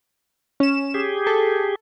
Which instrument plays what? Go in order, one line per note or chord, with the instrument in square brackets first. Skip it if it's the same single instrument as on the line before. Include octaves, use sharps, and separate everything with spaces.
[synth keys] C#4 E7
[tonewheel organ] G4 G#4
[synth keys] A4